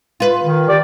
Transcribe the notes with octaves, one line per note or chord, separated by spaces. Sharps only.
F4 B4
D#3
G4 D5